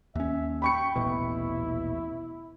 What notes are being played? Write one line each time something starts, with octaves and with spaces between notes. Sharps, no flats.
D#2 C#4 E5
G5 B5 C#6 C#7
D#1 A1 B2 E4